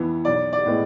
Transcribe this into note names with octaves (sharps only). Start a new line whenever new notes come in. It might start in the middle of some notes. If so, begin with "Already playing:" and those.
Already playing: F2 E3 B3
B1 D5
D5
A2 G#3 B3